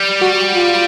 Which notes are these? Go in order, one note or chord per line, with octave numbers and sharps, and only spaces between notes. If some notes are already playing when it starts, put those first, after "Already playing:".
Already playing: G3
F#4
F4